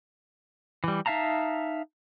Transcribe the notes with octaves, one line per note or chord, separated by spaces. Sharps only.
E3 G3
D#4 E5 F5 A5 A#5